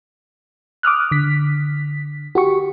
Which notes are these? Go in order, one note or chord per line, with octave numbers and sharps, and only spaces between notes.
D6 D#6 F6 F#6
D3 B6
F#4 G4 C#6